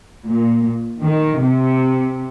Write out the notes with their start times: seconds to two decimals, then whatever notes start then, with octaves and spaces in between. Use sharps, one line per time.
0.24 A#2
1.01 D#3
1.39 C3